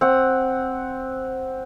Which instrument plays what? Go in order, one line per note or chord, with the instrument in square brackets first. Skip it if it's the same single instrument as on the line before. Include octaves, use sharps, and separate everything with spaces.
[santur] C4 F#5